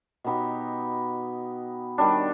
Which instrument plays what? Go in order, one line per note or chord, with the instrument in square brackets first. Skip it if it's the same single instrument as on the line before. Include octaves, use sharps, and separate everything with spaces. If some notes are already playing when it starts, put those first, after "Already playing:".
[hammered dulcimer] B2 B3 D#4 G4
D#3 G3 D4